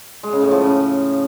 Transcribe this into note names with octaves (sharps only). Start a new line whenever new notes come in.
G#3
C#3
A2
F3
C#3